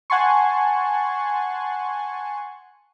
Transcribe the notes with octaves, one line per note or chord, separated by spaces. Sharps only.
F#5 G#5 A5 C6 C#6